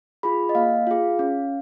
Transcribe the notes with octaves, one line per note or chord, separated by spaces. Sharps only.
F4 G#4 B5
D#5
A#3 F5
F4 G#4
C#4